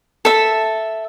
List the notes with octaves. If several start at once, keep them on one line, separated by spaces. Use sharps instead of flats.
A4 E5